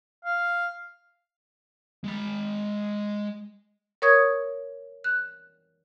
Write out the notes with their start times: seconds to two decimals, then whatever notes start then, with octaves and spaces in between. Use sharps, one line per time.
0.25 F5
2.04 G#3 B5
4.02 A#4 C#5 C#6 D#6 G#6
5.04 F#6